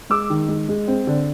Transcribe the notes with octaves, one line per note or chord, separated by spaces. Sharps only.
G#3 D6 E6
D#3
G#3
G#3
C4
D3